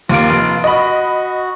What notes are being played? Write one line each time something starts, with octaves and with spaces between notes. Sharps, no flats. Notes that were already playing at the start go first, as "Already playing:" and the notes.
D#2 A#3 F4 D7
F1
F#4 D#5 B5